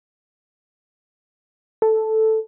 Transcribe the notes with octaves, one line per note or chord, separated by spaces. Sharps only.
A4